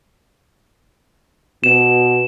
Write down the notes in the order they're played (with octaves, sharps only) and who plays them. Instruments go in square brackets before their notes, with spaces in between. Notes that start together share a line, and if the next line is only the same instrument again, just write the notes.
[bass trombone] B2 [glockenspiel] E7